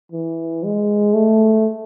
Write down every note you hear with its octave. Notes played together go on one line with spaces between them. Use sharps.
E3
G#3
A3